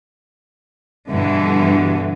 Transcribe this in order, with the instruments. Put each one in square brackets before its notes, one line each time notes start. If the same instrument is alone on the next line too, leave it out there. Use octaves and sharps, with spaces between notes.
[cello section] G2 B2 D3 E3